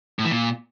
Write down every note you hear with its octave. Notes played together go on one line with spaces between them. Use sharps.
A2
E3
A#2